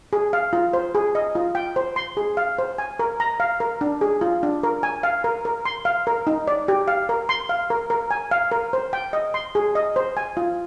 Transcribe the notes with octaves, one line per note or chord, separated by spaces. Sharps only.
G#4
F5
F4
C5
G#4
D#5
F4
G5
C5
C6
G#4
F5
C5
G#5
A#4
A#5
F5
A#4
D4
G#4
F4
D4
A#4
G#5
F5
A#4
A#4
C6
F5
A#4
D#4
D5
G4
F5
A#4
C6
F5
A#4
A#4
G#5
F5
A#4
C5
G5
D#5
C6
G#4
D#5
C5
G#5
F4